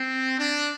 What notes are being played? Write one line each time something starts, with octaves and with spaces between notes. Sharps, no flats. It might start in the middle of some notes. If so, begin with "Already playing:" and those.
Already playing: C4
D4